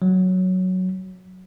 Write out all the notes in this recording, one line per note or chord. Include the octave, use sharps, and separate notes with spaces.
F#3